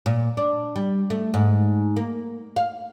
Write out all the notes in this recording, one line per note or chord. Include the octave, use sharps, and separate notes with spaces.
A#2
D4
G3
A3
G#2
A#3
F5